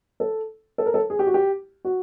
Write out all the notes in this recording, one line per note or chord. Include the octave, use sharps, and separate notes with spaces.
A4
A4
A#4
A4
G#4
G4
F#4
G4
F#4